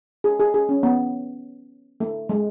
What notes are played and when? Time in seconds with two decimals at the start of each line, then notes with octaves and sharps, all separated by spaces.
0.24 G#4
0.40 G#4
0.54 G#4
0.69 C#4
0.83 B3
2.00 A3
2.29 G#3